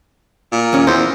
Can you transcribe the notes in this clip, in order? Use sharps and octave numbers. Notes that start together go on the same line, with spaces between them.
A#2
D#2 C#4
E2 C5